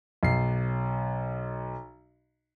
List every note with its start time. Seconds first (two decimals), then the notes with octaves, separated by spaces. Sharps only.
0.23 B1 C7